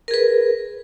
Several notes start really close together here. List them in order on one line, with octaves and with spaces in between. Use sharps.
A#4 G#4 B4